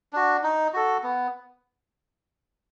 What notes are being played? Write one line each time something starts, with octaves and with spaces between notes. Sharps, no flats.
D4 F#4
D#4
F#4 A4
B3